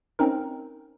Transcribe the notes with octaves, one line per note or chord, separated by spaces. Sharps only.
C4 C#4 D#4 A#4